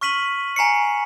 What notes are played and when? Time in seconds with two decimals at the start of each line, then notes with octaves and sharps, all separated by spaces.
0.01 C#6 F6 B6 D#7 F#7
0.56 G#5 A#5 C7 C#7